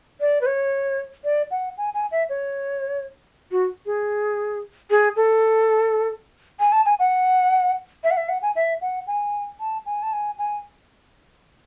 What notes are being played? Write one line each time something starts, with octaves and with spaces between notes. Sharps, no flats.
D5
B4
C#5
D5
F#5
G#5
G#5
E5
C#5
F#4
G#4
G#4
A4
G#5
A5
G#5
F#5
E5
F#5
E5
F#5
G#5
E5
F#5
G#5
A5
G#5
A5
G#5
G#5